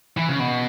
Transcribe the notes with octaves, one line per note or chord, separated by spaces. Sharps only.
E3
C#3
B2